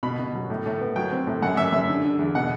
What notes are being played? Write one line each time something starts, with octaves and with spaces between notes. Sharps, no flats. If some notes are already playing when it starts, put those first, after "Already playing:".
B2 B5
B2
F#3
A2
A2
B3
F#3 G5
C4
A2
F#2 F#5
F#2 E5
F#2 E5
D3
D3
E2
B2 F#5